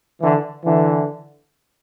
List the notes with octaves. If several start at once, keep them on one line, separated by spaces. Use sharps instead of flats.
D3 E3
D3 E3